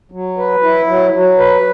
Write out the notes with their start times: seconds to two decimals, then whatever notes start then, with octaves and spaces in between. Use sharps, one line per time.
0.12 F#3
0.38 B4
0.63 E4
0.87 F#3
1.13 F#3
1.38 B4